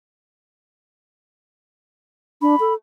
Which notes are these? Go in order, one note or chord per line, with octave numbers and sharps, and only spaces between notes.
D4 B5
A4